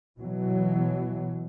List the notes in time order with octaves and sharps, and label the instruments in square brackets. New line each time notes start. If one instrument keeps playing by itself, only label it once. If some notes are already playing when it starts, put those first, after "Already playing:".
[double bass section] B2 E3 F#3